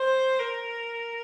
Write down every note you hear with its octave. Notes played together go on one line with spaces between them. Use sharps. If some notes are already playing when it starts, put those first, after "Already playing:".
Already playing: C5
A#4